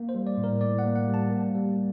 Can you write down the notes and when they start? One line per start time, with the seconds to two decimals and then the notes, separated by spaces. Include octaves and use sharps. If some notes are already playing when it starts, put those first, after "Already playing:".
Already playing: A#3
0.09 C5
0.15 G3
0.27 D5
0.37 A2
0.44 A#4
0.61 A2 D5
0.79 F#5
0.84 A#3
0.96 F#5
1.08 G3
1.14 A5
1.31 A#3
1.55 G3